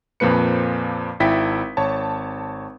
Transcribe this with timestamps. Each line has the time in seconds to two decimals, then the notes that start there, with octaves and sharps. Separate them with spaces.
0.20 F2 A#2 F3 A#3 B4 C#7
1.20 G#1 E4 G5 B6
1.77 G#1 C#5 A5